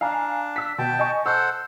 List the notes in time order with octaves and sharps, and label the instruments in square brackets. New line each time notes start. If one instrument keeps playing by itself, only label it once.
[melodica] D4 [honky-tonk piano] F5 G#5 A#5
[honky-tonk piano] E6 B6
[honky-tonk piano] B2 [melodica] G5 A5
[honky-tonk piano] D#5 G#5 C#6
[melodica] A4 C5 F#5 [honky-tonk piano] E6